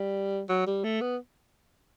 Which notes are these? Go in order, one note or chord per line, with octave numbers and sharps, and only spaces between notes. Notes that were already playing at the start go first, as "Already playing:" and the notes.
Already playing: G3
F#3
G3
A3
B3